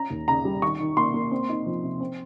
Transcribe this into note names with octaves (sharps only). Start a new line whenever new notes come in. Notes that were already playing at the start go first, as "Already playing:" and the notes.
Already playing: C#4 A#5
D#2
C#3 A#5
G3
D#3 C#6
D#3
A#3 C6
A#3
C4
D#4
F3
C3
C4